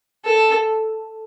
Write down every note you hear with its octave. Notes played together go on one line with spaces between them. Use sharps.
A4